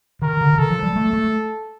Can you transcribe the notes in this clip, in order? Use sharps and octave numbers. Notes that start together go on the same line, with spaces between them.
D#3 A#4
D3
D3
D#3 A4
F3
G3
A3
A3